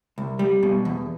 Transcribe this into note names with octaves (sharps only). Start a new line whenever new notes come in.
C2
G3
B2
E2